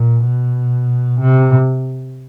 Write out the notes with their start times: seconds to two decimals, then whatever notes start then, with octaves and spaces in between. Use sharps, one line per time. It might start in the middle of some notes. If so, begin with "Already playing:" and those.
Already playing: A#2
0.25 B2
1.20 C3